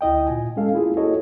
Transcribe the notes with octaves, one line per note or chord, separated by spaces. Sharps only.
D2 E4 D#5 G5
A#2 F4 G#5
G#3 C#4 A4 F5
A#3 E4 F4 G#4
E4 F#4 G#4 A4 C#5 D#5